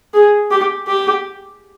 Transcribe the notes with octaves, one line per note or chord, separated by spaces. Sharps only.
G#4
G4
G4